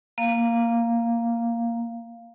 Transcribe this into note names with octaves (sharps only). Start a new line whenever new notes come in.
A#3 F5